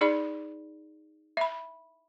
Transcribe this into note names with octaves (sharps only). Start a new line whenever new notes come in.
D#4 G#4 D5 B5
E5 B5